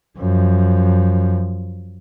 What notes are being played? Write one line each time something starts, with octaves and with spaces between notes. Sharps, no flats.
F#2 F3